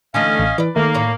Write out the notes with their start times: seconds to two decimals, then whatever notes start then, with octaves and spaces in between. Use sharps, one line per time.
0.14 D3 E3 A3 C#4 D#5 F5
0.39 A1
0.58 E3 B4 D5
0.76 D#3 A3 A#3
0.94 A2 C#4 A#4